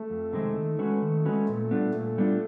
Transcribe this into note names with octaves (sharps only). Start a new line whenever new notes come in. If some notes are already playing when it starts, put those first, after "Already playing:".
Already playing: A3
F2
C3 D#3 G#3 C4
D#3
G#3 C#4 F#4 B4
D#3
G#3 C#4 F#4 B4
A#2 A3
G3 B3 D4 F4
A#2 A3
G3 B3 D4 F4